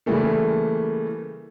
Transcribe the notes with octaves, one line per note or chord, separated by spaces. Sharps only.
C#3 E3 G3 A3 A#3